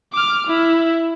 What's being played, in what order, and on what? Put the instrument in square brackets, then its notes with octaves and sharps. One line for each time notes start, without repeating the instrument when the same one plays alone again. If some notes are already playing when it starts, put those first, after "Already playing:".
[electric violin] D6 F6
E4